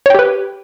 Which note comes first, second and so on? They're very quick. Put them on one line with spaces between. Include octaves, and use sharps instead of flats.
C#5 G5 G4 B4